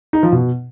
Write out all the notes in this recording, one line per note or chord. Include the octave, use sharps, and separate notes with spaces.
D#4
F3
B2